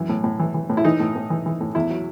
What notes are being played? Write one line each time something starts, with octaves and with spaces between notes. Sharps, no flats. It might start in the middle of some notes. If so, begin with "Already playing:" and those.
Already playing: F#2 E3
A2
A2
E3
E3
A2
E4
E3 D#4
A2
A2
E3
E3
A2
E2 E4
F#3